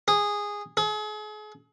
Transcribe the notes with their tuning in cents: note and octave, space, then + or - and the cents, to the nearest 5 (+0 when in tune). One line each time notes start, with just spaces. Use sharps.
G#4 -10
G#4 +40